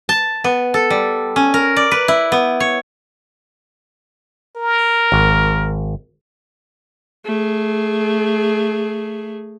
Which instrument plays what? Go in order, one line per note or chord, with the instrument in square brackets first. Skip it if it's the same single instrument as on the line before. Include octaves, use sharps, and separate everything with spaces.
[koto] A5
B3
A4
G3
C#4
A#4
D5
B4
E4
B3
C#5
[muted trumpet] A#4
[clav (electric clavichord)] G#1
[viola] A3 G#4